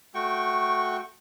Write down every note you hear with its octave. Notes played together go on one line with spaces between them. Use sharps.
A3 F#4 G5 C#6